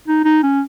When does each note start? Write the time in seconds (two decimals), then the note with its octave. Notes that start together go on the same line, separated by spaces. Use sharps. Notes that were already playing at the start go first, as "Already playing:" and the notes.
0.08 D#4
0.25 D#4
0.43 C#4